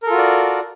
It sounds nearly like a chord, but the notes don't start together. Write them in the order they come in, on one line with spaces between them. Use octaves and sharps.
A#4 A4 F4 F#4 D5